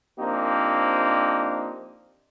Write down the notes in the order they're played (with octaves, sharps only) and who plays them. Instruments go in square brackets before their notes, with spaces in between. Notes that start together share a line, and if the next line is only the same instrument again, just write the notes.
[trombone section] F3 A#3 C4 D4 D#4 G4